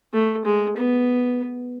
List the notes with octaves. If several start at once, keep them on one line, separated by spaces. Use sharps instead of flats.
A3
G#3
B3